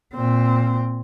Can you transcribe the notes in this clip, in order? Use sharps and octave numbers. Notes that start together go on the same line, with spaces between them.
A#2 C4